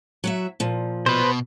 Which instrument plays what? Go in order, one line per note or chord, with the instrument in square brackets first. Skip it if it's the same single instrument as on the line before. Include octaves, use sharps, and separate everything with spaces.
[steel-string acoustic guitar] F#3 F#4 E5
A#2 F3
[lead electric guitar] B2 [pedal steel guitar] B4 C5